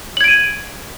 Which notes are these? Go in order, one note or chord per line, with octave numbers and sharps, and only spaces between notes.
G#6 D7 D#7 F#7